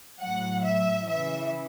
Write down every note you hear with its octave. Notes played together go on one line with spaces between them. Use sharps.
A2 F#3 F#5
E5
C#3 E3 E5